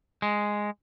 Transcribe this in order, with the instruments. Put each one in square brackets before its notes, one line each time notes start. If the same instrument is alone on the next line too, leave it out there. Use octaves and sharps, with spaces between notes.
[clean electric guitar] G#3